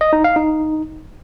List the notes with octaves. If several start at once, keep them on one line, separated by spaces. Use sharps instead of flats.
D#5
D#4
F5
D#4